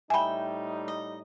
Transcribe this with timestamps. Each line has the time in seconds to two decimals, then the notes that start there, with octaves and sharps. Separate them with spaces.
0.10 A2 G3 D#4 E5 G5 G#5 B5
0.88 D#5